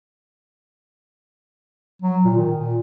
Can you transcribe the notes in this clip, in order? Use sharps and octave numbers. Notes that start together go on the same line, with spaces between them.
F#3
A#2
D#3
A#2